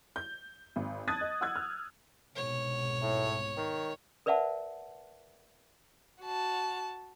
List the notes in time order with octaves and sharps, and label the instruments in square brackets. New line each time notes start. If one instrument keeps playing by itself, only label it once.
[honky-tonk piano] G6
G#1
A5 D#6 F#6 G#6 A6
D#5
F#5 E6 F#6 G#6
F6
[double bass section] C2 G#2 B2 [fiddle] C#5
[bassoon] A2
D#3
[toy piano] A#4 B4 D5 E5 F#5 A5
[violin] F#4 A5